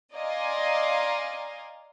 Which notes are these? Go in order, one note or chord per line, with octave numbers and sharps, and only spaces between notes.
D5 D#5 F5 G#5 A#5 C6